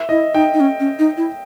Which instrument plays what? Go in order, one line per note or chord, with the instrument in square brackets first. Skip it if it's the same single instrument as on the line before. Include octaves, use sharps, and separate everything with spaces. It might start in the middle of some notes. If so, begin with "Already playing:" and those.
Already playing: [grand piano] E5
[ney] E4 [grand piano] D#5
[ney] D#4 [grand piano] G5
[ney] D#4
C#4
C#4
D#4
E4